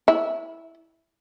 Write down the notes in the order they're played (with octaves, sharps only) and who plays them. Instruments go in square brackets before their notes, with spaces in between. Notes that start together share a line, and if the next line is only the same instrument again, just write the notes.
[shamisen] E4